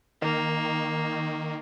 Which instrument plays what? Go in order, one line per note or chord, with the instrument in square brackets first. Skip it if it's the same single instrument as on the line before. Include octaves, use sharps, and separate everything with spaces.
[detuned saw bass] D#3 [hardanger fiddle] A#3